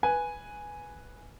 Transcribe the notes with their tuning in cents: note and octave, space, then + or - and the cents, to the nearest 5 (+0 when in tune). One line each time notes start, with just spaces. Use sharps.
B4 -5 G#5 +0